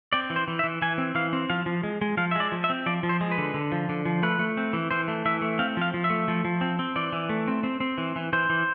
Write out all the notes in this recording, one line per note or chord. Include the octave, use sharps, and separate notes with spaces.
C4 D5
E3
C5
E3
E5
E3
E3 G#5
C4
E3 F5
C4
F3 F5
F3
G#3
G#3
F3 F5
E5
G#3 D5
F3
E5
C4
F3 D5
F3
C5
G#3
B4
D3
D3
F3
D3
F3
A3 B4
A3
C4
E3
E3 C5
A3
E3 E5
A3
C4 F5
F3 F5
F3
E5
A3
F3
F3
C4
C4
E3 D5
E3
A3
C4
C4
C4
E3
E3
E3 C5
E3